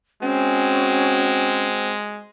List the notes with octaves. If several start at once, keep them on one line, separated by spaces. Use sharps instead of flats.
G#3 C4 C#4 F#4